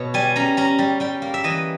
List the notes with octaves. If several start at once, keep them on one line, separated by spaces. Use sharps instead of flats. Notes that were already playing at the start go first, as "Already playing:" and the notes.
Already playing: B2 C#5
G3 G#5
C#4 A#5
C#4 A#5
G3
G3 G5
A#3
E5
E3 D#5